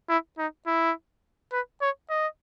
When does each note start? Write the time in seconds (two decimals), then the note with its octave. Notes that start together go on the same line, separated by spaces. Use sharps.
0.09 E4
0.38 D#4
0.67 E4
1.52 B4
1.81 C#5
2.10 D#5